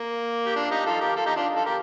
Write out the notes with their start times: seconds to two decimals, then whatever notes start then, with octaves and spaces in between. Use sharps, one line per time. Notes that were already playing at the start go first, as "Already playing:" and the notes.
Already playing: A#3
0.46 G4
0.56 D4 F4
0.71 D#4 G4
0.86 F4 A4
1.01 G4 A#4
1.16 F4 A4
1.26 D#4 G4
1.36 D4 F4
1.56 F4 A4
1.65 G4 A#4